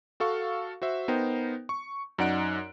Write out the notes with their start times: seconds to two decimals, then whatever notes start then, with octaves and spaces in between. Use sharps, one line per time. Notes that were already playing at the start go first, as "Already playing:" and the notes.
0.20 F#4 A4 F5 C#6
0.82 F#4 C5 E5
1.08 B3 D#4 A#4 C5 G5
1.69 C#6
2.18 F#2 D#4 D5 F#5 F#6 D7